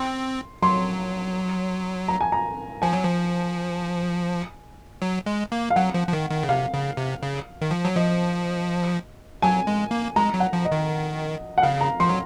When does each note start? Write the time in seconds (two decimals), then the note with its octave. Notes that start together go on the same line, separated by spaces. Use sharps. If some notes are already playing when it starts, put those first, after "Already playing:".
Already playing: C4 C6
0.63 F#3 C6
2.08 A#5
2.21 G#5
2.32 A#5
2.82 F3 G#5
2.93 F#3
3.05 F3
5.02 F#3
5.26 G#3
5.52 A#3
5.70 F5
5.76 F#3 F#5
5.94 F3
6.07 F3
6.13 D#3
6.31 D#3
6.43 C#3
6.49 C3 F5
6.74 C#3
6.97 C3
7.23 C#3
7.62 D#3
7.71 F3
7.85 F#3
7.95 F3 D#5
9.42 F#3 G#5
9.67 G#3
9.91 A#3
10.16 G#3 A#5
10.34 F#3
10.40 F#5
10.53 F3
10.65 D#5
10.72 D#3
11.58 F#5
11.62 C#3 F5
11.81 A#5
12.00 F3 C6
12.09 F#3